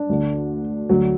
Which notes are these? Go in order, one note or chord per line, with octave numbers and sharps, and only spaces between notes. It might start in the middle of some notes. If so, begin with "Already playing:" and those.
Already playing: D4
D2 D3
D2 D3 F#3